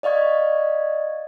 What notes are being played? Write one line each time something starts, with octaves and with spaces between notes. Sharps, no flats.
D5 D#5 F5 C#6 G#6